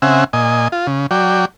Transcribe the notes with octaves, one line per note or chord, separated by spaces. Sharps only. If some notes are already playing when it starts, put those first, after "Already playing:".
C#3 C4 E5 F#5 G#5
A#2 D#5 G#5
F4
C#3
F#3 D5 G5